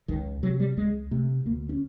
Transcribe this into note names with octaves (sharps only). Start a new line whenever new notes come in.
C#2 D#3
C3 F#3
G3
C#2 G#3
C3 A3
D2 A#3
C#4